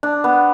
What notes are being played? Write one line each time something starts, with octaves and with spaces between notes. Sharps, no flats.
D4
B3